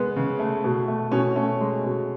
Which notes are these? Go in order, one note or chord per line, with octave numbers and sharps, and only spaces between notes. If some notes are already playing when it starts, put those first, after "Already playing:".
Already playing: G#3 B3
C#3
A3
B2
A3
B2 C#4
A3 C#4
G#3
B2